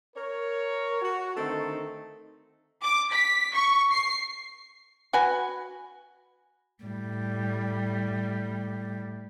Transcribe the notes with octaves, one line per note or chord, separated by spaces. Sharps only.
A#4 C#5
F#4
D3 D#3 A3 C4 D#4 A4
D6
B6
C#6
C7
F#4 B4 G#5
A2 G3